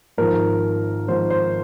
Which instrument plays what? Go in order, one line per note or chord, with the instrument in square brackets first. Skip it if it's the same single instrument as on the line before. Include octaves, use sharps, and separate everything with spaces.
[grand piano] G#1 G#2 F3 A#4
G#1 G#2 F3 C5
C5